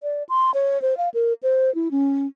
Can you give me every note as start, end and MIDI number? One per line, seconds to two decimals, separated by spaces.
0.03 0.23 74
0.29 0.51 84
0.54 0.78 73
0.82 0.97 72
0.97 1.09 77
1.14 1.33 70
1.43 1.73 72
1.75 1.91 64
1.91 2.27 61